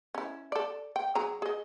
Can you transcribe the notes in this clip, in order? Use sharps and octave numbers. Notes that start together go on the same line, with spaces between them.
C#4 E4
A4 D5
G5
F#3 G#4 A#5
G#4 D#5